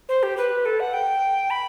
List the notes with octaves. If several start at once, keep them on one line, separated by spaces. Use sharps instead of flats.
C5
G4
B4
A4
F#5
G5
B5